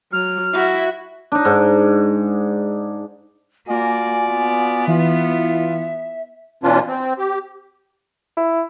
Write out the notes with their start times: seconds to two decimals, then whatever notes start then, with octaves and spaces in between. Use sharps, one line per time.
0.12 F#3 F6
0.54 E4 F#4 E5
1.32 D4 D#4
1.45 G#2
3.68 A#3 F4 F#4 D5 G#5
4.31 B3
4.87 E3 F4 E5
6.63 B2 E3 C#4 D4 F4
6.88 C4
7.19 G4
8.37 E4